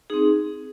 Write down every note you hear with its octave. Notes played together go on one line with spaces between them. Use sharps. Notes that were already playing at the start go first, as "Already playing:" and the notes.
C4 D#4 G#4